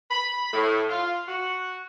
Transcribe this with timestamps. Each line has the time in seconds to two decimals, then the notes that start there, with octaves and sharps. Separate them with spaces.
0.11 B5
0.53 A2
0.89 F4
1.28 F#4